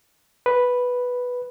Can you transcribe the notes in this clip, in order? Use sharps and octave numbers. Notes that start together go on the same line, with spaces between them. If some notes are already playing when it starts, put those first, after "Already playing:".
B4